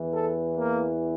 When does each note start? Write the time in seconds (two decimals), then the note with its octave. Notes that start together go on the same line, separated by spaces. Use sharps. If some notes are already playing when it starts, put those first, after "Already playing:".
Already playing: E2 E3
0.13 A4
0.55 A#3